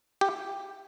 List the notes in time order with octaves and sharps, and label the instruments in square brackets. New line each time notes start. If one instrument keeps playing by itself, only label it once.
[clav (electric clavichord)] G4